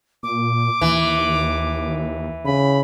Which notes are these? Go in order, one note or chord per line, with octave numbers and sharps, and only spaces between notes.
A#2 D6
D#2 E3
C#3 B5